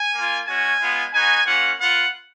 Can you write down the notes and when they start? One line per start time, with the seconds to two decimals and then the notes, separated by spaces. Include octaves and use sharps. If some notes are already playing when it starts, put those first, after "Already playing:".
Already playing: G#5
0.14 A#3 F4
0.47 G#3 C#4 F#4 G#5
0.80 G#3 B3 F4
1.12 B3 D#4 F#4 G#5
1.45 A#3 C#4 F4 F#5
1.78 B3 F4 F#5